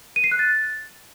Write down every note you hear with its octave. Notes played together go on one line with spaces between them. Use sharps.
D#7
C7
F#6
A6